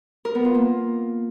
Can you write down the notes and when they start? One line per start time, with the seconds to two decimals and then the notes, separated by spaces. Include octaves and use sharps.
0.25 A#4
0.35 B3
0.45 F4
0.55 A#3